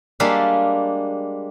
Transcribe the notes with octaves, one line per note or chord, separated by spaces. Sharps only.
G3 G#3 A#3 D4 E5 F5